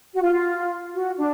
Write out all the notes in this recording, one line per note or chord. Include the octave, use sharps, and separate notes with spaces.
F#4
F4
F#4
D4